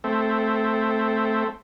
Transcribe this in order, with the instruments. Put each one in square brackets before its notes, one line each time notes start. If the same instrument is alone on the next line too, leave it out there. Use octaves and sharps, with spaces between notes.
[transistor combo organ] A3 C4